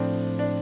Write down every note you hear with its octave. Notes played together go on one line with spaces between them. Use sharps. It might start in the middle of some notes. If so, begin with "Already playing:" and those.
Already playing: A2 F3 C4 D4
D4